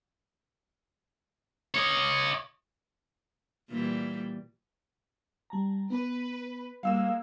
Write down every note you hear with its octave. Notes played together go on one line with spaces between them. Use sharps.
C#5 D#5
A#2 E3 G3
G3 A5 A#5
B3 B4
G3 G#3 A#3 F5 E6 E7